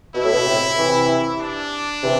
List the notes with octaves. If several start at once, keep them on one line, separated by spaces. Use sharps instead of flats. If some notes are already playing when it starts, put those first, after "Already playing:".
B2 E4
A2
B2
A2 C3
C3 E3
D4
C3 E3